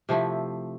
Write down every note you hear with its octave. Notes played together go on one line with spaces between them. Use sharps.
C3 F3 A3 E4